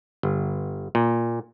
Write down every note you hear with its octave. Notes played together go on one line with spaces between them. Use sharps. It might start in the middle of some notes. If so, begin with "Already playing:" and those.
G1
A#2